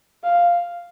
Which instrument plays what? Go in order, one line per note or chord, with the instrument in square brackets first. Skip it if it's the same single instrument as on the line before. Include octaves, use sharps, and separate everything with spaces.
[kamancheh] F5